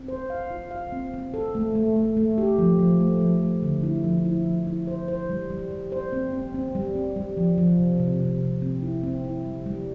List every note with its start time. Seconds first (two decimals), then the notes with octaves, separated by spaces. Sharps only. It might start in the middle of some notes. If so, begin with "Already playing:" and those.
Already playing: C4
0.08 C5
0.30 F5
0.51 F4
0.71 F5
0.92 C4
1.14 C4
1.34 A4
1.55 A3
1.75 A3
1.96 A3
2.17 A3
2.38 G4
2.59 F3
2.79 F3
3.00 A3
3.21 F3
3.41 A3
3.62 D3
3.83 E4
4.04 F3
4.25 E4
4.46 F3
4.67 E4
4.87 C5
5.08 C5
5.30 G3
5.50 G3
5.71 G3
5.92 C5
6.12 C4
6.33 C4
6.54 C4
6.75 G3
6.95 C4
7.16 G3
7.37 F3
7.58 F3
7.79 C3
8.00 C3
8.20 C3
8.41 C3
8.62 C4
8.82 E4
9.03 C4
9.25 E4
9.45 G3
9.66 G3